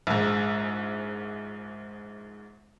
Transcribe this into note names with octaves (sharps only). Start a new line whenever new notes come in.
A#1 G#2